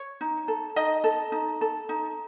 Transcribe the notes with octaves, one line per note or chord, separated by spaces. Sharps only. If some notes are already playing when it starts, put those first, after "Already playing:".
Already playing: C#5
D#4
A4
D#4 D#5
A4
D#4
A4
D#4